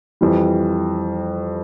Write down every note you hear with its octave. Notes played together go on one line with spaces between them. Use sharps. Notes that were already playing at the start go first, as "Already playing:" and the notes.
F2 E3 G3